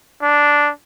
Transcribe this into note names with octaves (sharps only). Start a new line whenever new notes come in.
D4